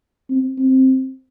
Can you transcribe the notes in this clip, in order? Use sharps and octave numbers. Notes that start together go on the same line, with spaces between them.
C4
C4